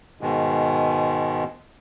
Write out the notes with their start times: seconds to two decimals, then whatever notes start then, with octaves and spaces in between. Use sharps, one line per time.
0.21 G#2 B2 D#3 G#3